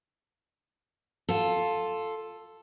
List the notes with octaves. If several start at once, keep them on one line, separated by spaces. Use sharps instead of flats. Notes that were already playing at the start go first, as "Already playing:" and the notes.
F4 A4